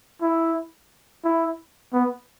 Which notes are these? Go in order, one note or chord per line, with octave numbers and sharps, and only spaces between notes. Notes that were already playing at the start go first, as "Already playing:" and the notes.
E4
E4
B3